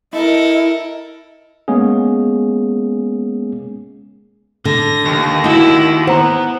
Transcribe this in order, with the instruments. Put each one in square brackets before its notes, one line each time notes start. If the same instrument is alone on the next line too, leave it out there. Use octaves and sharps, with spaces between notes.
[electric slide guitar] E4 [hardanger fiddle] A4 A#4 [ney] D#5
[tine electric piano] G#3 A#3 B3 C#4 G#4
[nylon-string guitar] D3 [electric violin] A#6
[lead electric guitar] D#2
[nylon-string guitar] D#4 F#4 [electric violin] E4
[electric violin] B3 E4 [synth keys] C5 A#5 [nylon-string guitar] F#5